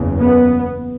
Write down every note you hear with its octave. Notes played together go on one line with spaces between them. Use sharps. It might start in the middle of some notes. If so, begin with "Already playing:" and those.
Already playing: F#1 E2 C#3
B3